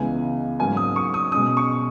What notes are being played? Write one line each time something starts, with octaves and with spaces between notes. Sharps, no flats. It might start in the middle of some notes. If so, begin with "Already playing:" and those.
Already playing: C#2 C#3 E3 G#3 B3 G#5
G#2 F#3 A#3 C#4 G#5
D#6
C#6
D#6
B2 G#3 C#4 D#6
C#6